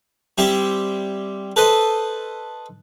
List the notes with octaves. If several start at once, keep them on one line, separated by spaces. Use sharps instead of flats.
G3 C4 E4 G4
A4 B4 C5 D#5